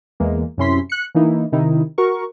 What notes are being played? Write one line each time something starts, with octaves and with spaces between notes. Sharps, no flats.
E2 E3 G#3 A#3
F#2 C3 C#4 E4 C6 B6
F#6 C#7
E3 A#3 D#4 E4
C3 D#3 D#4 E4
F#4 A#4 C#6